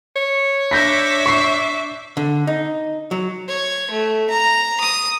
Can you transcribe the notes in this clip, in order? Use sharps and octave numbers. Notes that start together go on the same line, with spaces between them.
C#5
D4 E5 D6 G6 A#6 B6
C#6 C7
D3
D#4
F#3
C#5
A3
A#5
D#6